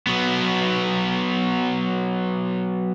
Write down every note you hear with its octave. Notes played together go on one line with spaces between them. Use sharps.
F#3 B3